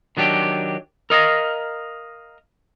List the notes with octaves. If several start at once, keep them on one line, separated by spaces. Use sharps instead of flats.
D#3 F#3 D4 G4
A#4 D#5 F5 A#5